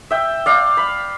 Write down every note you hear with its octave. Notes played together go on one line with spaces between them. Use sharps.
E5 G5
D5 F5
B5